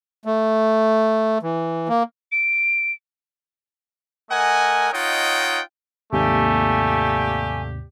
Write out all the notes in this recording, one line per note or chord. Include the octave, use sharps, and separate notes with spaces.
A3
E3
A#3
D7
A3 A#4 D#5 F#5 G#5
D#4 F4 C#5 D#5 F#5 G5
D#2 G#2 C3 G3 A3 A#3 G4 G#5